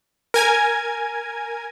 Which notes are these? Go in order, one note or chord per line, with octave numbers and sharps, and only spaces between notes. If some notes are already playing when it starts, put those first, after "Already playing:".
A#4 G#5 G#6